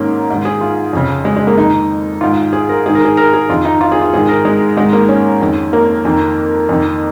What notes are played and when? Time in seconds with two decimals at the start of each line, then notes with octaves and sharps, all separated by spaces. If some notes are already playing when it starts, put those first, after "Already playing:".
Already playing: G#2 D#3 A#3 C#4
0.30 G#2 D#3
0.45 G#4
0.61 F4
0.93 F2 C#3
1.25 G#3
1.36 G#3
1.47 A#3
1.57 F2 D#3 D#4
2.21 G#2 D#3 F4
2.53 G#4
2.69 A#4
2.86 G#2 D#3 G#4
2.95 A#4
3.05 G#4
3.17 A#4
3.34 G#4
3.49 F2 D#3 F4
3.65 D#4
3.81 F4
3.92 G#4
4.01 F4
4.13 G#2 D#3 G#4
4.29 A#4
4.45 G#3
4.77 G#2 D#3 G#3
4.93 A#3
5.08 C#4
5.41 F2 D#3
5.73 A#3
6.05 F2 D#3
6.69 F2 D#3